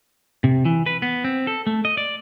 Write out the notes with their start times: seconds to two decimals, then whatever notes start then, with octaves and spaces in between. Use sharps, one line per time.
0.44 C3
0.65 E3
0.86 B4
1.02 B3
1.24 C4
1.47 A4
1.67 A3
1.85 D#5
1.97 D5